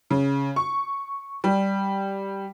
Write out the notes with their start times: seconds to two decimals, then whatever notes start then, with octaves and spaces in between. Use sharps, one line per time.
0.10 C#3
0.56 C#6
1.44 G3